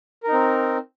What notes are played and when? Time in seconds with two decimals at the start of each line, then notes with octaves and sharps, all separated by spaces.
0.23 A#4
0.28 D#4
0.33 C4